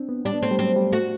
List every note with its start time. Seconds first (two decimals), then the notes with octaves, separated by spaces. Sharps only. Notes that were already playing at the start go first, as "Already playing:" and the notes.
Already playing: C4 D4
0.09 B3
0.25 G3 D4
0.34 B3
0.42 A3 C4
0.51 G3
0.59 F#3 C4
0.76 G3
0.93 A3 F#4